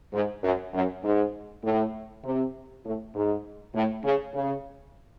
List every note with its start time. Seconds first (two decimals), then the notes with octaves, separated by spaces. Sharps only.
0.14 G#2
0.43 F#2
0.74 F#2
1.04 G#2
1.64 A2
2.24 C3
2.84 A2
3.15 G#2
3.75 A2
4.04 C#3
4.34 C#3